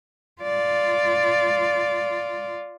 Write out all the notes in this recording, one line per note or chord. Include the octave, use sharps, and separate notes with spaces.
F4 D5